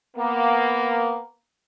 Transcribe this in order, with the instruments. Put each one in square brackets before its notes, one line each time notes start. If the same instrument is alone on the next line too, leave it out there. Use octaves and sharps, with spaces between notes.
[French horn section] A#3 B3